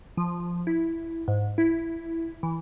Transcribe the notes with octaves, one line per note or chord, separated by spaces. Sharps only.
F3
E4
G#2
E4
E3